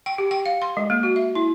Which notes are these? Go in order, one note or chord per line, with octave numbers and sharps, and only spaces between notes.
G5
G4
G5
F5
C6
G#3
A#3
F#4
E5
E4